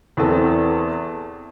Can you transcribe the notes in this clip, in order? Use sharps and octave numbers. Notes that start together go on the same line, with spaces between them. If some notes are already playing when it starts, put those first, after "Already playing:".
E2 E3 C4 A4